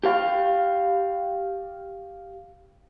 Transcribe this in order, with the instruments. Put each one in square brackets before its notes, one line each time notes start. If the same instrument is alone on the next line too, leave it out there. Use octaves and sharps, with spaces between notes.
[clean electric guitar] G4 F5